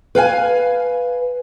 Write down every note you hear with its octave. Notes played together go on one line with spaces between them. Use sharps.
B4 F5 G5 G#5